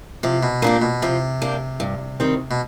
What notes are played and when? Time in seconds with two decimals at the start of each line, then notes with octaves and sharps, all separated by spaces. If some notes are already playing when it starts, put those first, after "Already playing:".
0.23 C3 F3
0.43 B2
0.62 A#2 A#3 D4 G4
0.82 B2
1.02 C3 F3
1.42 A#3 D4 G4
1.80 G2
2.20 D#3 G3 C4
2.51 B2